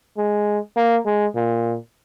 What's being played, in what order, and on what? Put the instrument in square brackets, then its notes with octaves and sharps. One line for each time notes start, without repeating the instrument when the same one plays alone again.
[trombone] G#3
A#3
G#3
A#2